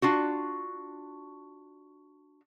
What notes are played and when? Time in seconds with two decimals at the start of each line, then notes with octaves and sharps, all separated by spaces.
0.02 D4 F4 F#4